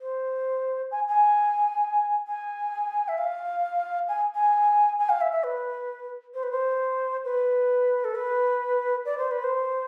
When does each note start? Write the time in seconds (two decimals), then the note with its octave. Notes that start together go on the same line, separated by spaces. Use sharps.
0.01 C5
0.91 G#5
1.09 G#5
2.27 G#5
3.08 E5
3.18 F5
4.08 G#5
4.35 G#5
4.99 G#5
5.09 F5
5.21 E5
5.32 E5
5.44 B4
6.34 C5
6.43 B4
6.51 C5
7.25 B4
8.04 A4
8.15 B4
9.05 D5
9.18 C5
9.31 B4
9.44 C5